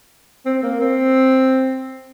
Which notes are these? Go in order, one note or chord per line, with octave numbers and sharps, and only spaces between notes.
C4
A#3
C4